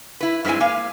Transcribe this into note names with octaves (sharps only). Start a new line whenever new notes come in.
E4 B4
G2 G#3 C4 E4 G#5
A#3 F5 G#5